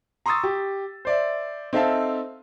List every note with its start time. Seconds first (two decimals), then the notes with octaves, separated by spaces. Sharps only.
0.26 A#5 C6 C#6 D#6 E6 A6
0.44 G4
1.05 C5 D5 E5
1.73 C4 D#4 A4 E5 F5 A5